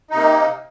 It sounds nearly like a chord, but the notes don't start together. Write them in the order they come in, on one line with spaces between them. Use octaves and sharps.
D#4 C3 A#3